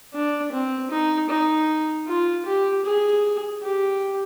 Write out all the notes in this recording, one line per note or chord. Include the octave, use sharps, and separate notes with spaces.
D4
C4
D#4
D#4
F4
G4
G#4
G4